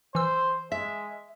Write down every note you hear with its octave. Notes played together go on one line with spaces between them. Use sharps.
E3 C5 E6
G#3 E5